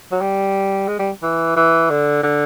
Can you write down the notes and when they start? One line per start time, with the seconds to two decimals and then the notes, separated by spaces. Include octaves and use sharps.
0.12 F#3
0.21 G3
0.88 G#3
0.99 G3
1.22 E3
1.56 E3
1.90 D3
2.23 D3